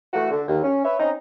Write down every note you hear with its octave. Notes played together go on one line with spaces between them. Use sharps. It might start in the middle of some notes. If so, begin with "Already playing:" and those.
E3 A3 F#4
D3
D#2
C#4
B4 C#5 E5
C4 C#4 D#4